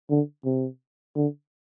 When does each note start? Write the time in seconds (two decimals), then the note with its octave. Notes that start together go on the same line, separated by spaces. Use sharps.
0.10 D3
0.45 C3
1.16 D3